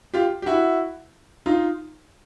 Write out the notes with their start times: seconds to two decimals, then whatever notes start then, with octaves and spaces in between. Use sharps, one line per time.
0.14 F4 G4
0.42 G4
0.46 E4 F#4
1.46 D#4 F4